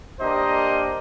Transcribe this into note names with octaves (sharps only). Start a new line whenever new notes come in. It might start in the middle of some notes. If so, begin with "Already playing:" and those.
A#3 D4 G4 A#4 C5 D#5